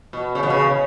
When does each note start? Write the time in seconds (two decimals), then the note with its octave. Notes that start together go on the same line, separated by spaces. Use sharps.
0.13 B2
0.35 C#3
0.43 B2
0.50 C#3